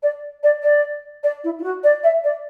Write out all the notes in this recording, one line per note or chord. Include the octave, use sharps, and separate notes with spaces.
D5
D5
D5
D5
E4
E4
F#4
D5
E5
D5